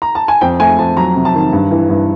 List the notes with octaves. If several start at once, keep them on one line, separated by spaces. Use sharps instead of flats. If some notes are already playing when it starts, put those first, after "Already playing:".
A#5
A5
G#5
F2 G5
A3 G#5
F2 A5
F#3 A#5
C3
A5
D#3
G2
E3
G2